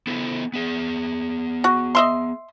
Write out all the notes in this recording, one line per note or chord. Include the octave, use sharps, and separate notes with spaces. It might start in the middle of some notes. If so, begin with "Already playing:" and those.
B3 E4 A4
B3 G#4
F#4
D#5 E5 C6